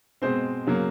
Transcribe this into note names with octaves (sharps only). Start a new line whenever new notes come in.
B2 G#3 C4 C5
C#3 F#3 A#3